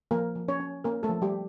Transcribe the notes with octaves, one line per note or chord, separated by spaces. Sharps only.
F3 A#3 A#4
F3
C#4 C#5
C#4
A#3 C#4 A#4
A3 A4
F3
G3 G4